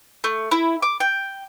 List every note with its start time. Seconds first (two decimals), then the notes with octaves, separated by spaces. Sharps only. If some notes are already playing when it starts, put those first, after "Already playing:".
0.24 A3
0.51 E4
0.82 D6
1.00 G5